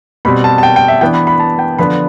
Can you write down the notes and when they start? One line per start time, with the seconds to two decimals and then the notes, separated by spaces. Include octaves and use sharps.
0.25 B2 G3 C4 B5
0.44 A5
0.58 A5
0.63 G5
0.76 G5
0.88 E5
1.01 E3 B3 D4 G5
1.14 B5
1.27 B5
1.40 A5
1.59 G5
1.79 D3 F3 B3 D4 B5